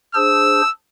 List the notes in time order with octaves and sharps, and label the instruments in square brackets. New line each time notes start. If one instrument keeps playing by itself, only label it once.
[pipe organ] D4 G#4 C5 [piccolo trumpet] E6